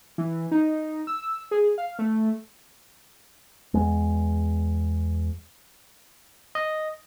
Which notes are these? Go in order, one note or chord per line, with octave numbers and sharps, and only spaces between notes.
E3
D#4
E6
G#4
F5
A3
E2 G#3
D#5